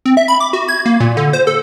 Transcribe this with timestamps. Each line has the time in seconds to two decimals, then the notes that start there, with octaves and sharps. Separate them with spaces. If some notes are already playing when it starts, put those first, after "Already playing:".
0.05 C4
0.17 E5
0.28 B5
0.40 D6
0.53 F#4
0.68 G#6
0.86 A#3
1.00 A#2
1.17 D3
1.33 C5
1.47 A4